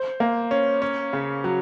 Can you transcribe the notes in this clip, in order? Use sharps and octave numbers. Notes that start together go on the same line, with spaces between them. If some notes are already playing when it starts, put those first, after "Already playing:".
Already playing: C5
A#3
C#4
C#4
C#3
F#3